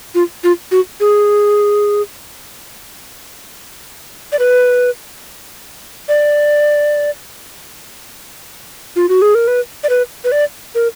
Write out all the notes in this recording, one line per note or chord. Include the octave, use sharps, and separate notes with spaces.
F4
F4
F#4
G#4
D5
B4
D5
F4
F#4
G#4
A#4
B4
D5
B4
B4
D5
A#4